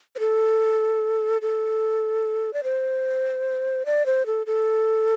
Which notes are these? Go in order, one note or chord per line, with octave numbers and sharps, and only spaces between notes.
C5
A4
A4
D5
C5
D5
C5
A4
A4